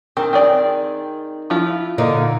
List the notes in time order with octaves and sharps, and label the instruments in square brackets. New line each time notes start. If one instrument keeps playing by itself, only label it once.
[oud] D#3 [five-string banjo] C4
[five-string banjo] C4 G#4 D5
F3 E4 F4
[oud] A#2 D3 D#4